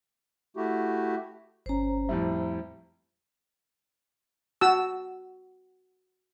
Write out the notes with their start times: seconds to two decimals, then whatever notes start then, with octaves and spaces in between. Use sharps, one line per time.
0.57 A3 E4 F#4 G4
1.66 G1 C#4 C5 A#5
2.09 F2 A2 G3 E5
4.61 F#4 A5 E6